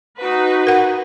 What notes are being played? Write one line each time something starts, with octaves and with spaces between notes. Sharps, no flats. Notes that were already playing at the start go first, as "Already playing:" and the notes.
D#4 F#4 B4
A#4 F#5